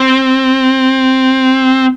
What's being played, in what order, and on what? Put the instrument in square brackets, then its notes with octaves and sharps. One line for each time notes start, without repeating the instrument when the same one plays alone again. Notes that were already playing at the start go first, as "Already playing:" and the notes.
Already playing: [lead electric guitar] C4